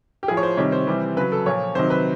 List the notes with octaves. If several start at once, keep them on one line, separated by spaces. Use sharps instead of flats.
G4
A2 F3 G#4
C#5
C5
C3 D#3 G3 C#5
C5
C3 E3 G3
C#3 F#3 B4
A4
A#2 F3 C#5
C3 D#3 F#3 C5
B4